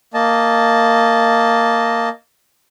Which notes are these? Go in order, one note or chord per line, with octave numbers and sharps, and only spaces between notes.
A#3 D#5 A5